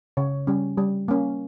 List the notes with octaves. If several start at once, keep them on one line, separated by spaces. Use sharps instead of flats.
C#3 C#5
G3 C#4
G3
A#3 C#4